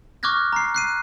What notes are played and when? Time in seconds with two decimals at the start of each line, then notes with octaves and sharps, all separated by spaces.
0.23 C#6 D6 F6 F#6 G#6 A#6
0.53 A#5 C7
0.75 F#6 C7 D#7